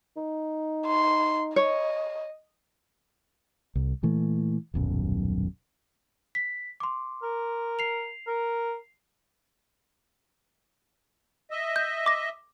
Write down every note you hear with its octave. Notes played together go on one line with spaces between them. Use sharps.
D#4
C6
C#5 D#5
C2
A#2 E3 A3
D#1 B1 F#2
B6
C6 D6
A#4
C7 F7
A#4
D#5 E5
G6
D6 A#6